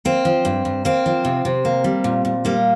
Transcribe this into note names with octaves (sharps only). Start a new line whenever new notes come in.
A#3 C4
F3
G2
G2
A#3 C4
F3
C3
C3
A#3
G3
A#2
A#2
G3 A#3